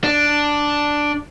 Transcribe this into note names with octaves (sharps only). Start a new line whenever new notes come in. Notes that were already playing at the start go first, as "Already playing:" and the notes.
D4